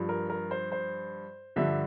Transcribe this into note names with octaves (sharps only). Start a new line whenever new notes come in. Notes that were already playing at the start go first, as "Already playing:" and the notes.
Already playing: G2 F3
A#4
A#4
C5
C5
G2 D3 F3 E5